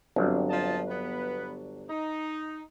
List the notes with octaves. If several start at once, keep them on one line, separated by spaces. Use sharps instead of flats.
G1 F#3 C4 D4
F3 D#5 A5
B3 B4
D#4